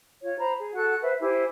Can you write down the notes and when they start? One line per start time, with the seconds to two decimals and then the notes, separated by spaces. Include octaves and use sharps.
0.23 F4 C#5
0.38 C5 A#5 B5
0.57 G#4
0.74 F#4 A4 F#5 F#6
1.02 B4 C5 E5
1.20 E4 G4 C5 G#5